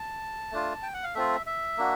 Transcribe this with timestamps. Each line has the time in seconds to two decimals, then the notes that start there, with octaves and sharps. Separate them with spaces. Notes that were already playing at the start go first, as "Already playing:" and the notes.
Already playing: A5
0.52 A3 D4 F4
0.83 G5
0.94 F#5
1.03 F5
1.15 A3 C4 F4 E5
1.46 E5
1.78 A#3 D4 F#4